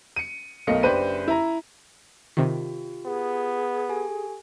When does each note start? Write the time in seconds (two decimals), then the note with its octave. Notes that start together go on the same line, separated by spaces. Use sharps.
0.16 C#7 D#7
0.67 B1 A3 A#4 D#5 F5 C#7
0.83 F#1 D4 G4 B4 C5 D#7
1.28 E4 A#5
2.37 C3 D#3 F4 G4
3.06 B3 G#4
3.89 G4 A4 G#5